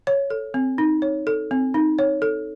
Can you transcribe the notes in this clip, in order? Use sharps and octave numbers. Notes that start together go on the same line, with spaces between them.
C#5
A4
C4
D#4
C#5
A4
C4
D#4
C#5
A4